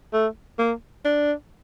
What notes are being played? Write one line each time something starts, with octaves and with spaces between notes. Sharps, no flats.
A3
A#3
D4